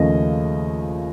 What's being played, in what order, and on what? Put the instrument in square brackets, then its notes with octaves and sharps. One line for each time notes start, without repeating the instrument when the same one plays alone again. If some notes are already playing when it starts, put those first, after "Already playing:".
Already playing: [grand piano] D#2 C#3 F3 A3 D#5